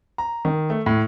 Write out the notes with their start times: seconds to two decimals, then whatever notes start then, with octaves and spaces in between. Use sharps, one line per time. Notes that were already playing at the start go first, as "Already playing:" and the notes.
0.18 A#5
0.45 D#3
0.70 A3
0.86 A2